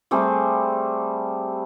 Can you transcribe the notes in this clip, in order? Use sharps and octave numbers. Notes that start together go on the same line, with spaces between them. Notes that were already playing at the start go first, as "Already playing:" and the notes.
G3 A3 C4 G#4